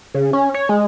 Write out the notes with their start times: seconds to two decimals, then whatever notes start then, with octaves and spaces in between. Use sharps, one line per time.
0.15 C#3
0.33 C#4
0.54 C#5
0.69 G#3